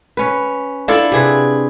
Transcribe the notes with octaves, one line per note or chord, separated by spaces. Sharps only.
C#4 B4
D4 E4 F4 A4
C3 G#4 B4